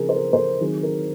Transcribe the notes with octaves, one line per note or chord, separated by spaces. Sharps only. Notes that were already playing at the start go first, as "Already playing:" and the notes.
Already playing: C#3 F3 C4 G#4 A#4
C5
A#4
C5
A#4
D#3 F#3 C4 G#4
A#4